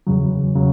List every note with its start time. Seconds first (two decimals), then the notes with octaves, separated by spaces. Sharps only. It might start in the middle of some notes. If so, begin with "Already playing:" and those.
0.07 E2 C#3 F#3
0.56 C#3 F#3